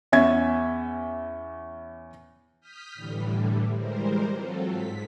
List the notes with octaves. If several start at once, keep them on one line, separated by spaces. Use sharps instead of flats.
E2 C#4 E5 G#5 G#6
D#6 F6 G6 B6
A2 D3 E3 G3
E3 G3 G#3 A#4 C5
F#3 C4 F4 A4
G#2 B6